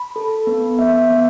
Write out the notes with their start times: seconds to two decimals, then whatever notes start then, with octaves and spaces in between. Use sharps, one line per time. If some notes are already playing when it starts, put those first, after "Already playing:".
Already playing: B5
0.16 A4
0.47 B3
0.79 B3 E5
1.10 B3